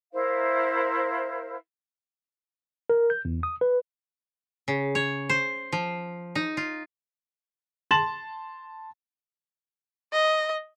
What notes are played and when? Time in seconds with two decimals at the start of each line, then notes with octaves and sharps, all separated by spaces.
0.12 E4 A#4 C5 F5
2.90 A#4
3.10 G6
3.25 E2
3.43 D#6
3.61 B4
4.68 C#3
4.95 C#5
5.29 C5
5.72 F3
6.35 D#4
6.57 F4
7.91 A5 C6 A6 E7 F#7
10.13 D#5